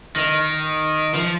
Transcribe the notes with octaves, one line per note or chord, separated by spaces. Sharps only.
D#3
F3